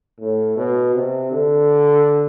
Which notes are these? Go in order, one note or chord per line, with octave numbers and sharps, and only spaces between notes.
A2
B2
C3
D3